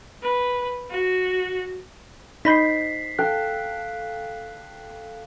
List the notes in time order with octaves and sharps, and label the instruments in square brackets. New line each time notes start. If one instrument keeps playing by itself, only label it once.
[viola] B4
F#4
[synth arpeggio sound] D#4 G6 [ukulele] C5 D#5 B5 [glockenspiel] B6 C7
[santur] A4 F5 G5 [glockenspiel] F#6